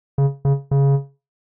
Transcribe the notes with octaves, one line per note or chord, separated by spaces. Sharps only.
C#3
C#3
C#3